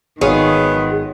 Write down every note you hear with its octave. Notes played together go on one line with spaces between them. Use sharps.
G#1 D#3 B3 F4 G#4 C#5 D#6